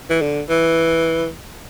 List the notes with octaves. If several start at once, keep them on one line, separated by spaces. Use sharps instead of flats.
E3
D3
E3